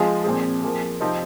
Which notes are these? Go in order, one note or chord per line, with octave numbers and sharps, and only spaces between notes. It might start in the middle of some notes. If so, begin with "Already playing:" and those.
Already playing: F3 G#3 F4 G#4
A#2 F3 C4 G#4
F3 A#3 G#4
C3 F3 C4 D#4